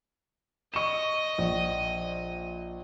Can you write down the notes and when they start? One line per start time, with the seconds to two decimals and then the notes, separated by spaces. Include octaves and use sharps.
0.74 D#5 C#6 E7
1.38 A#1